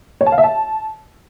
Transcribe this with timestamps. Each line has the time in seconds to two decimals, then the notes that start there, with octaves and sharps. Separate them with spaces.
0.21 C#5
0.26 A5
0.32 F5
0.38 E5
0.44 A5